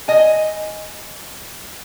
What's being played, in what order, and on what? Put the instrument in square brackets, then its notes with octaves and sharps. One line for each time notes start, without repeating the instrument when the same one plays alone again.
[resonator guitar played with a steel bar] D#5 G#5